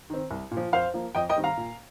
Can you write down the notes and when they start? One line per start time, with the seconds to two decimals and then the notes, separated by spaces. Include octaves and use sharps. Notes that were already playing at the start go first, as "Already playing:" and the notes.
0.10 D#3 C4
0.31 C2
0.51 A#2
0.57 F3
0.73 F2 C5 F5
0.94 F3 A#3
1.15 F2 D#5 G5
1.29 D#5 G5
1.36 D#3 G3 C4
1.44 F5 A#5
1.57 A#2